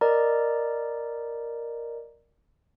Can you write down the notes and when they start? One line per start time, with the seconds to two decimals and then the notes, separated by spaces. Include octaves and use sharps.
0.01 A#4 D5 D#5 A#5